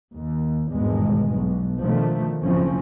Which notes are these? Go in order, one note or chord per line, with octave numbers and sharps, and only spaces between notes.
D#2
G#1 E2 G2 B2 G#3
B1
B2 D3 D#3 F3 A3
F#1 A2 F3 C4 C#4